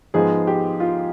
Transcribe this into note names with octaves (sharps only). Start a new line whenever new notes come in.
G#2 F3 G#3 B3 G#4
G4
F4